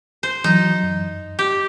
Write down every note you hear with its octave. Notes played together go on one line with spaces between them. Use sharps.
C5
E3 F#3 D#4
F#2
G4